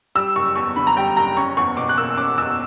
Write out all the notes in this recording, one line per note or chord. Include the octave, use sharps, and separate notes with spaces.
G3 E6
F#1 C#6
E2 C#6
D3 B5
A#5
G3 G5
F#1 A#5
C#4 C#6
E2 C#6
B2 D6
F#6
A#3 E6
C#4 D6
E2 E6